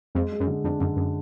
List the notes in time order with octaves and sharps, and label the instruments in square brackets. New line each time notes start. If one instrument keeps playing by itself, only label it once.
[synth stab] F2 [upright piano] G#3
[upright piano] G#3
[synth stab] F#2
[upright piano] D3
[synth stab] F2 [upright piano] D4
[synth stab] F#2 [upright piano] D3
[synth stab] F#2